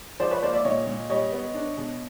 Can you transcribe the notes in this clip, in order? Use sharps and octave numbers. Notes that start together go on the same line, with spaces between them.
F3 C5 D5
B4 C#5
A#3 C5 D5
D5 E5
A#2 C#5 D#5
A#2
G3 C#5 D#5
B3
D4
B2